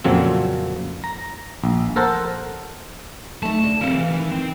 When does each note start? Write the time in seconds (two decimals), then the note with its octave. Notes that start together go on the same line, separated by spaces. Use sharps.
0.04 F2 A#2 C#3 F3 F#3 C4
1.04 A#5
1.64 A#1
1.96 A4 A#4 C5 F#5 A5
3.43 A3 D#4 A5
3.64 D3
3.81 C3 C4 A4 A#4 F5
3.93 E3
4.11 D#3 D#4
4.31 C4